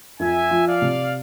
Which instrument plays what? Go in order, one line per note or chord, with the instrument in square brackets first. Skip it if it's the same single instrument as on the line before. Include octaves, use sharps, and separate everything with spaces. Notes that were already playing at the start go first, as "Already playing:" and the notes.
[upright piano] F2 [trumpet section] E5 G#5
[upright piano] F3
[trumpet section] D5 F5
[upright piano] C3